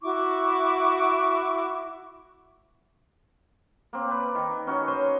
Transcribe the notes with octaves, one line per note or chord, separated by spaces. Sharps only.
E4 F#4 C#6 D6
A#3 C4
B4 D5
D#3
C#4 D#4 F#4 C#5
C5 C#5 D#5 C6